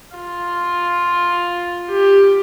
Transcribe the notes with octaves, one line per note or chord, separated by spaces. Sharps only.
F4
G4